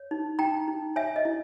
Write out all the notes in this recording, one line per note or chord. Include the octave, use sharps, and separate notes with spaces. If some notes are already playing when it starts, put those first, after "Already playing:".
Already playing: C#5
D#4
D#4 G5 A#5
D#4
C#5 E5 G#5
D#5
E4